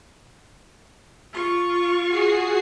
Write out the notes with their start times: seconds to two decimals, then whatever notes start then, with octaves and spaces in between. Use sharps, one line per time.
1.33 F4 C#6
2.08 F#4 G#4 C7